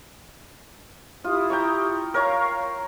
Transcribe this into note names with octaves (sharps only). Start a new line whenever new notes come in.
E4 F4 G4 D#6
G5 A#5 C#6
A#4 C#5 F5 A#5 C#6